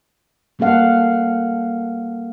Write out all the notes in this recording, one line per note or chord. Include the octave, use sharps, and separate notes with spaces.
G3 A#3 C#4 A4 F5 F#5